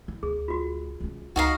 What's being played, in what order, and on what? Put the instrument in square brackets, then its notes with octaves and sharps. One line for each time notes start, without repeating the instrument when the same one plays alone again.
[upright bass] E4
[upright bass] D2 [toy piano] G#4
[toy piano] F4 F#4
[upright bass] G#3 C#4
[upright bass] C#2 [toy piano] D#4 A5 A#5 [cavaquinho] F#4 D#5 F5